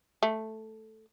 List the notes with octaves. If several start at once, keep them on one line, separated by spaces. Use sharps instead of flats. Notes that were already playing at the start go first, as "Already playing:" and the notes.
A3